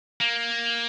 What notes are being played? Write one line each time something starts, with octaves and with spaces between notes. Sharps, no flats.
A#3